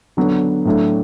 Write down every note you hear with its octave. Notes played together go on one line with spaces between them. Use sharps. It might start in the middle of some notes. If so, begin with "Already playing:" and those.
D3 F#3 B3 D4
A2 F#3 A3 D4